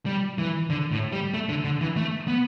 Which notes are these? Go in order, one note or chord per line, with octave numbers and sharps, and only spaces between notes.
G3
E3
D3
A2
G3
A3
D3
D3
E3
A3
B3